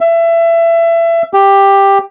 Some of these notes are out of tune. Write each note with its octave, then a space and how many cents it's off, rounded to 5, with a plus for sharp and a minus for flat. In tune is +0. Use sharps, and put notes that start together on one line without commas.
E5 +25
G4 +10